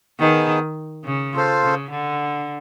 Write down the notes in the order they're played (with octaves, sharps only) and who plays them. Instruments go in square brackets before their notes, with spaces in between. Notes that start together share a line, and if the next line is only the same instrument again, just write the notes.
[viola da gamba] D#3 [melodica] B3 D#4 G#4
[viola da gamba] C#3
[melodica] F4 A4 C5 F5
[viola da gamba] C#3
D3